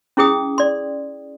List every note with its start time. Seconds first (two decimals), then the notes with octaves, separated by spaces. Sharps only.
0.17 C#4 E4 G#4 G5 D#6
0.58 D5 C6